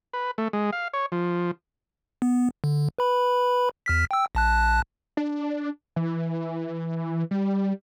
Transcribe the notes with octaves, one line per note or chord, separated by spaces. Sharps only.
B4
A3
G#3
F5
C#5
F3
B3
D3
B4 B5
E2 F6 B6
G5 E6
A#1 A5 F#6
D4
E3
G3